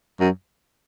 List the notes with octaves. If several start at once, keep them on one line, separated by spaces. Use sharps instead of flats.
F#2